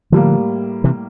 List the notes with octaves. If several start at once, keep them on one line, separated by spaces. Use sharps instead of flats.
A2 D3 F3 G3 A#3
C3 E3